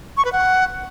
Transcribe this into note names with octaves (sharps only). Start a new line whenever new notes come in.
C#6
B4
F#5